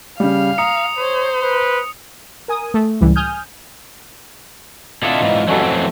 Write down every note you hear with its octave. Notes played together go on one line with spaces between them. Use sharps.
C#3 G3 F5
A#5 D#6 C#7
C5 C#5
B4
A#4 G#5 D#6
A3
C#2 A2 E3 G3
G#5 D#6 F6 G6
D3 C4 E4 F4 A4 D5 D#5 F#5
G#2 E3
F2 E3 F#3 G3 C#4 F4 F#4 A4
A3 C4